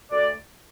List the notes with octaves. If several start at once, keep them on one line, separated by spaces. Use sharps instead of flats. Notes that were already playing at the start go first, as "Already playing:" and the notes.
D2 D5